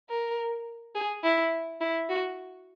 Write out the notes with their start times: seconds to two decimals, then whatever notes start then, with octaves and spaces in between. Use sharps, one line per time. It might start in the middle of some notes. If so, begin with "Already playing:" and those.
0.10 A#4
0.95 G#4
1.23 E4
1.81 E4
2.09 F#4